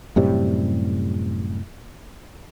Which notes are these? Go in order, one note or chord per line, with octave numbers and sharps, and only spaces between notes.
F#2 A2 C3 G3